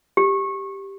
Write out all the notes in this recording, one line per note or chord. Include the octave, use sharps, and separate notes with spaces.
G4